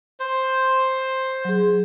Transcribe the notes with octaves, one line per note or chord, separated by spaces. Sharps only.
C5
F#3 G#4